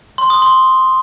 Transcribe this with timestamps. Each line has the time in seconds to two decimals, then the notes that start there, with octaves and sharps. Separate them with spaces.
0.18 C6
0.30 D#6
0.42 C6